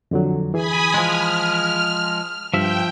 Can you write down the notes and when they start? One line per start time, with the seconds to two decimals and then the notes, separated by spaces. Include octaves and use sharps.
0.11 F2 D3 F#3
0.54 E3 G#4 G#5 B5 D#6
0.94 F3 G#3 F6
2.54 G2 F3 E5 G5